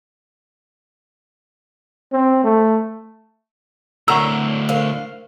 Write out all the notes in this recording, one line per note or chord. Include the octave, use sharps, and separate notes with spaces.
C4
A3
D2 A2 A#4 F#5 A#5 C#6 E6
A#4 C5 F5